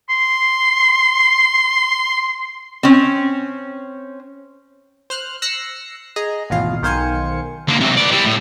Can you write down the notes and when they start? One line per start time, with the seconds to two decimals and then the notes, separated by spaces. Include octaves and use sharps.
0.09 C6 C7
2.83 C4 C#4
5.10 C5 F6 F#6
5.42 E6 F#6 A#6 C7 C#7
6.16 G#4 D#5 A#5
6.50 G#1 D#2 B2 E3 F4 F5
6.82 B1 D#3 C5 F5 G#5 C#7
7.68 D3 A#3
7.80 C3 F#3
7.97 B3 D5
8.11 G3 E4
8.25 A2